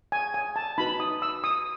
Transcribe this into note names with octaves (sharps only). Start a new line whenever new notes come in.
G#5
G#5
A5
D#4 F#4 B4 B5
D#6
E6
D#6